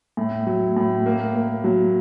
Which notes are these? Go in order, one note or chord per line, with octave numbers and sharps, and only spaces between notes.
A2
F#3
A2
A#3
A#3
F#3